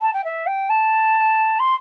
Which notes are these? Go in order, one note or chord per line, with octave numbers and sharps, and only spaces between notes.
A5
G5
E5
G5
A5
C6